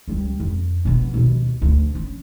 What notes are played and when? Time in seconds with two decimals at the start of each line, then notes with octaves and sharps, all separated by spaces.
0.08 C#2 G3
0.40 F2
0.85 B2 B3
1.14 D#2 B2
1.62 D2
1.95 C#4